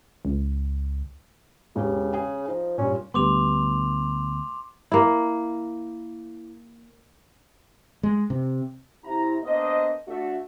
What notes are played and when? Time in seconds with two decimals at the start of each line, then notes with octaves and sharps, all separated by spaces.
0.25 C#2
1.76 E1 C#3 G4
2.14 G#4
2.48 F3 D#4
2.78 G2 A#2 C#4
3.14 D2 G3 B3 C6 D6 F7
4.92 A#3 E4
8.03 G#3
8.30 C3
9.04 C3 E4 A#5
9.43 A#3 B3 D4 C5 D#5
10.08 A3 D4 F#4 E5